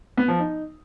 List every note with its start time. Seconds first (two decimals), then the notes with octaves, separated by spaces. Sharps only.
0.17 B3
0.28 F3
0.39 D#4